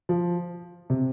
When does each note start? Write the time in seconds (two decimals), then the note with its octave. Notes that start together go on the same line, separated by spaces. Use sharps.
0.09 F3
0.90 C3